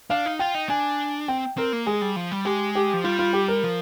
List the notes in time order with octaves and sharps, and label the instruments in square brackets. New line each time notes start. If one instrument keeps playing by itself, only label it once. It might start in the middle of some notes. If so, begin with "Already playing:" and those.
[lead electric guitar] D4 [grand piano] F5
[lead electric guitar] D#4
[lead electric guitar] F4 [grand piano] G5
[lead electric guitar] D#4
[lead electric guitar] D4 [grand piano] G#5
[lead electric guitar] C4 [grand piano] G5
[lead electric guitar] C4 [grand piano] A#4
[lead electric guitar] A#3
[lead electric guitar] G#3 [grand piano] G#4
[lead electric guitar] G3
F3
G3
[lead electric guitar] G#3 [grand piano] G4
[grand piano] G4
[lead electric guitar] F3
[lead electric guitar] G3 [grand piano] F4
[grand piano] F4
G4
A#4
[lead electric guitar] F3